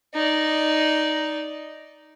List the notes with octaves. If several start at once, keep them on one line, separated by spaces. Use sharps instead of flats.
D#4 D5